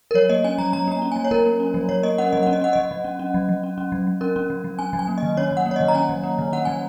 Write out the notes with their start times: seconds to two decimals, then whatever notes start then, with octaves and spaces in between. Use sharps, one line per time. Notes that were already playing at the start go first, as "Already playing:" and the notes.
0.11 A#4
0.14 F#3 C#5
0.29 A#3 D#5
0.44 C#4 G#5
0.58 F#3 A#5
0.73 F#3 A#5
0.88 A#3 A#5
1.02 C#4
1.12 F#3 G#5
1.25 C#5
1.31 F#3 A#4
1.46 A#3
1.60 C#4
1.74 F#3
1.89 F#3 C#5
2.03 A#3 D#5
2.18 C#4 F#5
2.32 F#3 D#5
2.43 C#4 F#5
2.53 D#5
2.62 C#4 F#5
2.73 F#3 D#5
2.91 F#3
3.04 C#4
3.19 C#4
3.34 F#3
3.49 F#3
3.64 C#4
3.78 C#4
3.92 F#3
4.07 F#3
4.21 C#4 A#4
4.36 C#4
4.50 F#3
4.64 F#3
4.79 C#4 G#5
4.93 F#3
4.99 G#5
5.08 A#3
5.18 D#5
5.23 D#3
5.37 C#4 C#5
5.51 F#3
5.57 F#5
5.66 A#3
5.71 C#5
5.76 D#3 D#5
5.88 A#5
5.95 C#4 G#5
6.09 F#3
6.23 A#3
6.39 D#3
6.53 C#4 F#5
6.65 F#3 G#5